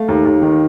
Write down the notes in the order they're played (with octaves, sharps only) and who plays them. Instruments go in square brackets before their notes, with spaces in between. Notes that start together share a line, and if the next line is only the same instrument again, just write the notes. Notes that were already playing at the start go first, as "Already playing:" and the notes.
Already playing: [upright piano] A3 F5
D#2
D#2
D#3